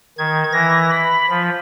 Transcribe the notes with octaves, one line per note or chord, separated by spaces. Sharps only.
D#3 G#6
E3 A#6
B5
F3